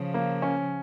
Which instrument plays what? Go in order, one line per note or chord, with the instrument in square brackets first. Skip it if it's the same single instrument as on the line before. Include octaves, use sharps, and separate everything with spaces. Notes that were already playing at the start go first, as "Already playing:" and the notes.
Already playing: [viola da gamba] C#3 F3
[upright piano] A#3
C#4